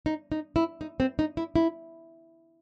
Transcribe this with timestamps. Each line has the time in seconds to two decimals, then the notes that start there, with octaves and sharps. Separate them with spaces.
0.06 D#4
0.32 D#4
0.56 E4
0.81 D#4
1.00 C4
1.19 D#4
1.37 E4
1.56 E4